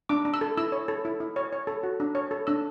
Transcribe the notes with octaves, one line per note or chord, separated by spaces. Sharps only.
D4 D6
D4
E6
A4
E4 E6
C#5
A4
E4
E4
C#5
C#5
A4
F#4
D4
C#5
A4
D4 E6